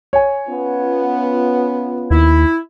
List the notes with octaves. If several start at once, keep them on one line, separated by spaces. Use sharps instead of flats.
C#5 G#5
B3 C#4 F4
D#2 E4